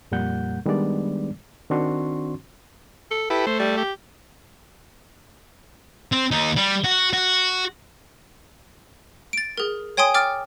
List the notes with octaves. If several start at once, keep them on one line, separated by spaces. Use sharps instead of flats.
F2 A#2 G3 A#3 F#5 G6
D#3 G3 G#3 B3 D4 D5
D#3 C4 D4 F#4 C6 C#6
A4
E4 G4 A4 B4
A3 C5
G3
G4
C4
D#2 D#4
G3
F#4
F#4
A6 D7
G#4 A#4
C#5 G5 G#5 C6 D#6
G5 D6 F6 A6